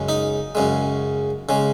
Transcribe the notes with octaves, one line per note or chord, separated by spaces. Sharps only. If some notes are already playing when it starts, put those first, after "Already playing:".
Already playing: F#2 C#3 G#3
D#4
F#2 C#3 G#3
C#3 G#3